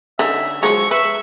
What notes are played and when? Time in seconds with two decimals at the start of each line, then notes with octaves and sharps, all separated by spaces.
0.19 D3 C#4 D#4 E5
0.63 F3 F#3 G#3 C#6
0.91 B4 E5